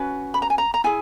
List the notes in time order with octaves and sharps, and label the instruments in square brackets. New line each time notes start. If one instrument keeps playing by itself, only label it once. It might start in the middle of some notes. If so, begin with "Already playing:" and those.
Already playing: [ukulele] C#4 F#4 B4
B5
A#5
G#5
A#5
A#5
E4 G#4 G#5